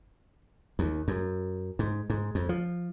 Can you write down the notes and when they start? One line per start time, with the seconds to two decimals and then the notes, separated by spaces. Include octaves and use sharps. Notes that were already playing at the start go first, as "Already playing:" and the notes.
0.79 D#2
1.08 F#2
1.79 G#2
2.10 G#2
2.35 F2
2.49 F3